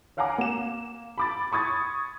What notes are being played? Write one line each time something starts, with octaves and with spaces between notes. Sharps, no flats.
C#5 F5 F#5 G#5 A#5 D6
A#3 E7
B5 D6 A6
B5 C#6 D#6 G#6 A6